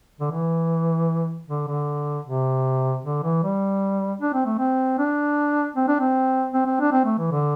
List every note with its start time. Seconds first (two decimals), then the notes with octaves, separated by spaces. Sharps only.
0.20 D3
0.32 E3
1.48 D3
1.68 D3
2.26 C3
3.04 D3
3.23 E3
3.43 G3
4.21 D4
4.34 C4
4.46 A3
4.58 C4
4.99 D4
5.76 C4
5.88 D4
6.00 C4
6.53 C4
6.66 C4
6.80 D4
6.92 C4
7.05 A3
7.18 E3
7.31 D3